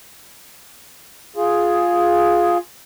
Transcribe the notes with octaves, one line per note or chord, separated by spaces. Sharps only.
F4 G#4